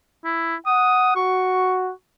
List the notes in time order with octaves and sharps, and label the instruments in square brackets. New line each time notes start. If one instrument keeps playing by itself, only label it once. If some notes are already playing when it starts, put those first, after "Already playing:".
[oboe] E4
[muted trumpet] F#5 [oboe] D#6
[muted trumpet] F#4 [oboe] C#6